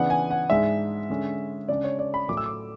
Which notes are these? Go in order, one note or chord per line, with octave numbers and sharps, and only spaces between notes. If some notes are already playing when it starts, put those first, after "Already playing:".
Already playing: C#3 E3 B3 D4 F#5
G#5
F#5
G#2 G#3 D4 E5
D3 G#3 C#4
C#3 G#3 D4 D5
C#5
D5
B5
A2 F#3 A3 D6
E6
D6